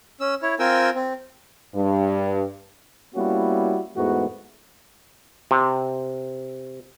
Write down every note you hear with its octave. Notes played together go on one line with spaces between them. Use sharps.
C#4 E6
E4 C#5
C4 F4 A#4 G5 G#5 E6
C4
G2
G3 A#3 B3 C#4 E4 F#4
E2 G#2 E3 A3 B3 F#4
C3